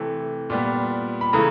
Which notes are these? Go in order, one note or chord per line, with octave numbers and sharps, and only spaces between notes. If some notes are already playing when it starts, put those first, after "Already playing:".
Already playing: C3 E3 A3
A#2 G3 B3
B5
C#3 E3 A3 A#5